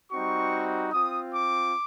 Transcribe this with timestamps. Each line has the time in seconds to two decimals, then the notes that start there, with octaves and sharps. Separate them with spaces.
0.12 G3 C4 D#4 F#4 C#6
0.93 C4 F4 D#6
1.34 D6